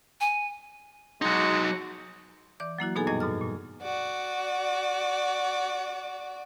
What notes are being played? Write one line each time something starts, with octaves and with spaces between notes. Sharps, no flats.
G#5
F#3 G#3 D#4 F#4
E3 D5 D6
F#3 A#3 E4 F#4
B2 B3 D#4 G#4 A4 G#5
F#2 A#2 G3 D#5 G#6
G#2 B2 A4 F6
A#2
F#4 D5